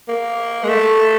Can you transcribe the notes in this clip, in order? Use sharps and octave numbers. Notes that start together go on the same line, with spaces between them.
A#3
G#3
A3